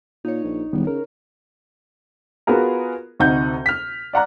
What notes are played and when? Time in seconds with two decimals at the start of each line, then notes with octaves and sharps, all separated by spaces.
0.25 A#2 D#4 C#5
0.44 A#1
0.73 E1 D#3 G3 B3
0.87 C#3 A#4
2.47 B3 F4 F#4 G#4 A#4
3.20 D2 C3 D#4 F#5 G6
3.66 F6 B6
4.13 D5 F#5 A#5 F#6